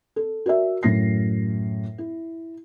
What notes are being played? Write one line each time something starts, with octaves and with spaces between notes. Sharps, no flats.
A4
F#4 A#4 D5 E5
F#2 A2 A#6 C7
E4